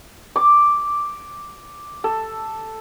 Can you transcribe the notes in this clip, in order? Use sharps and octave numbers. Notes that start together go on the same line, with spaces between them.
D6
A4